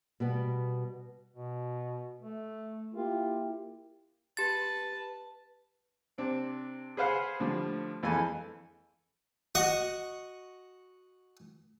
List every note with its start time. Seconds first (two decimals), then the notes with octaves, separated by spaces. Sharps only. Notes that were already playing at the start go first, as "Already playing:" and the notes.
0.20 B2 G3 B3
1.34 B2
2.21 A3
2.95 A#3 E4 F4 G4
4.37 G4 B4 A5 A6
6.18 C3 C4 D4
6.97 G#4 B4 C5 F5 F#5
7.40 A2 D3 F3 G3
8.03 F2 E3 G#3 A4 G#5
9.55 F#4 D#5 C#6